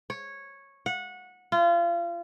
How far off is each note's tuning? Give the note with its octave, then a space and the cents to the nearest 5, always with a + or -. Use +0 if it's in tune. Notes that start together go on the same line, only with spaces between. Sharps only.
C#5 -10
F#5 -20
F4 -30